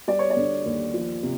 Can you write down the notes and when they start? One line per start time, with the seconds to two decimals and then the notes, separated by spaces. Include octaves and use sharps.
0.08 G3 D5
0.19 C#5
0.30 D5
0.37 D3
0.66 D#2
0.94 F3
1.23 C3